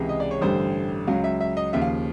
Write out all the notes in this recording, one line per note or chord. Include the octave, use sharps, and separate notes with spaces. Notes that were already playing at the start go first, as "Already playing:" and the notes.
Already playing: C#2 C3 E3 G#3
D#5
D5
C#5
A1 G2 D3 G3 C5
C#2 C#3 F#3 F5
E5
E5
D#5
D#2 C#3 F3 E5
F5